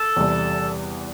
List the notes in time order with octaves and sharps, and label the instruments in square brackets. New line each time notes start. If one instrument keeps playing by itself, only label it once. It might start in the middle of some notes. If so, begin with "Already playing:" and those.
Already playing: [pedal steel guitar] A4
[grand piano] E2 C3 G3